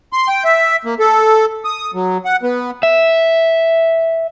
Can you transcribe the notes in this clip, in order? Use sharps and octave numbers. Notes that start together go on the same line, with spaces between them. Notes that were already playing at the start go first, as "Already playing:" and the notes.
C6
G5
E5
A#3
A4
D#6
F#3
F#5
B3
E5